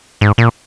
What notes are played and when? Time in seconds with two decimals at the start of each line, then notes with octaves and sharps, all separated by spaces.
0.21 G#2
0.38 A#2